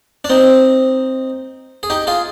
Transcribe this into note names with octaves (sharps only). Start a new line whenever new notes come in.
D4
C4 D#4
G#4
D#4 G4
F4 G#4